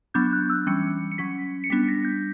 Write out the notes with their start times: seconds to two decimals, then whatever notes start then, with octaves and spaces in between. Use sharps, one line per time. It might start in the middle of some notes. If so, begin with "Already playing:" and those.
0.14 F#3 B3 D4 G6
0.33 F#6
0.50 E6
0.67 E3 G3 C#4 C#7
1.12 C#7
1.18 F#3 C#4 B6
1.64 C#7
1.70 G3 B3 D4 B6
1.89 A#6
2.05 G6